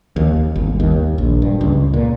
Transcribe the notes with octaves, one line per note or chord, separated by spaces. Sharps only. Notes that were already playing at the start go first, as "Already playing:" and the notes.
D#2
G1
D#2
A#1
G2
C#2
A#2